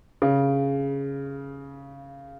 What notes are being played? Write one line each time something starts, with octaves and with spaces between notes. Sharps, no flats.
C#3